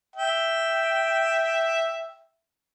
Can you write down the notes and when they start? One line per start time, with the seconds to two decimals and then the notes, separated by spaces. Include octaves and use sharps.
0.16 E5 G5